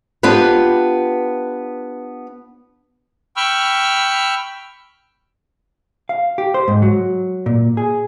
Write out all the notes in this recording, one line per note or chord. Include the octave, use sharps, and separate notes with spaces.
B3 D4 F4 G4 B4
G5 B5 C#6 E6 F6
F5
G4
C5
G#2
F#3
A#2
G#4